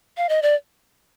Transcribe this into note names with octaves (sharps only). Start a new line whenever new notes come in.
F5
D#5
D5